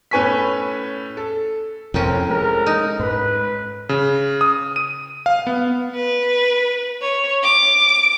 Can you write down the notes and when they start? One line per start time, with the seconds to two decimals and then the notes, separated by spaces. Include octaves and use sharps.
0.11 A2 C#4 B4 G#5 C#6 B6
1.17 A4
1.94 F2 A2 C3 F3 C4 C#4 A#4
2.29 G#3 A#4
2.66 D#4
2.99 G#2 B4
3.89 C#3
4.41 D#6
4.76 D#7
5.26 F5
5.47 B3
5.93 B4
7.02 C#5
7.42 D6